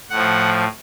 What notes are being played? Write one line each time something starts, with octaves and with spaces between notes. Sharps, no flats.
A2 F3 F#5